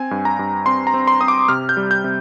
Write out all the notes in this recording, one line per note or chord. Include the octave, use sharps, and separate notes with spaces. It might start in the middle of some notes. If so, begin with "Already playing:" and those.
Already playing: C4 G#5
G2
A#5
G2
C4 C6
A#5
C4
C6
C4 D#6
D6
C3 F6
G6
G3
G6
C3